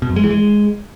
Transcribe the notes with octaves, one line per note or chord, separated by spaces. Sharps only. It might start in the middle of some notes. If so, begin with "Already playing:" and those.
B2
F#2
G#3
E3
G#3